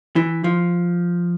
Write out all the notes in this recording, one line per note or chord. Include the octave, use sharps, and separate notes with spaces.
E3
F3